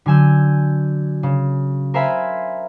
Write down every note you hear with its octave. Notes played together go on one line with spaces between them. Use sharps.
D3 F#3 G#5 E6 G6
C#3
A#4 C5 E5 F5 G#5 B5